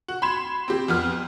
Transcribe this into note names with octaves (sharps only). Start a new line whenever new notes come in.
F#4
B5 C6 G#6 E7
C4 G4
F2 B3 F6